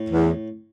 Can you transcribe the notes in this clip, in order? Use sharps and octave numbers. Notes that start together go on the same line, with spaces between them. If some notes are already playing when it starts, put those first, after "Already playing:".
Already playing: A2
E2